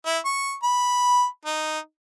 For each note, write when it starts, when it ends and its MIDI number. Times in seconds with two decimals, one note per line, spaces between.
0.06 0.18 64
0.25 0.54 85
0.63 1.25 83
1.45 1.78 63